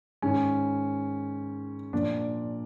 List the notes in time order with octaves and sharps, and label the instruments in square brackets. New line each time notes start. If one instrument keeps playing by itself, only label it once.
[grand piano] G#2 D#3 C#4
A#2 F3 D4